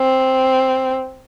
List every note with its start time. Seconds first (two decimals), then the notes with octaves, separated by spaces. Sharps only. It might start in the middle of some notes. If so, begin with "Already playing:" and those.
Already playing: C4